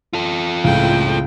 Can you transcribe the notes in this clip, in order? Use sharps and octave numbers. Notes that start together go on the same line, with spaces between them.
F4 A4
C#2 A2 G5